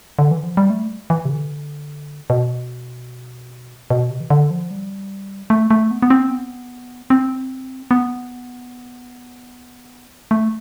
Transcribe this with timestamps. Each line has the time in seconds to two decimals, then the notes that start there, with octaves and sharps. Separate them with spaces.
0.19 D3
0.31 E3
0.44 F3
0.57 G3
0.70 A3
1.10 E3
1.25 C3
1.30 D3
2.30 B2
3.90 B2
4.10 C3
4.20 E3
4.30 D3
4.51 F3
4.71 G3
5.50 A3
5.71 A3
5.91 B3
6.02 B3
6.10 C4
6.30 B3
7.10 C4
7.91 B3
10.31 A3